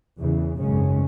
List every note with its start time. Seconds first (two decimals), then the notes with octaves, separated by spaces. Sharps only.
0.20 E2 C#3 E3
0.60 G#1 F#2 C#3 G#3 C#4